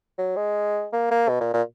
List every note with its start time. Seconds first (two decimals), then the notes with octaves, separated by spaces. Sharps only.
0.18 F#3
0.36 G#3
0.92 A#3
1.11 A#3
1.29 B2
1.41 A#2
1.53 A#2